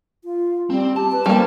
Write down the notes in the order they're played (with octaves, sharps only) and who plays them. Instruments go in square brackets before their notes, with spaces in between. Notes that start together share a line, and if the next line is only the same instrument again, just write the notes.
[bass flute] F4
[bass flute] G3 [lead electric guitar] C4
[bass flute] G4 [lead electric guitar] A5
[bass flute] B4
[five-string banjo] G3 A#3 [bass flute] C5